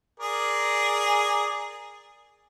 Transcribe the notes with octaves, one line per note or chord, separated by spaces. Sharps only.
G#4 A#4 D5